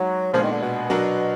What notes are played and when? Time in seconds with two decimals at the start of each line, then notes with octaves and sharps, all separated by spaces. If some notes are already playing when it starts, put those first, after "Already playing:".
Already playing: F#3 G#3 D#4 F#4
0.33 A#2 F3 G#3 B3 D4 G#4
0.42 D#3
0.52 D3
0.61 B2
0.90 F#3 D4 F#4 A#4